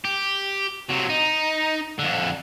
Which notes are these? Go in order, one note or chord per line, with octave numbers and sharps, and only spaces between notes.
G4
C3 F#3
D#4
F2 D3